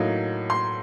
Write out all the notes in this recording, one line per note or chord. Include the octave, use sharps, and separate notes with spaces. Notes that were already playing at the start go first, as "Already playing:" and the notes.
Already playing: A2 F#3 A#3 D#4
C6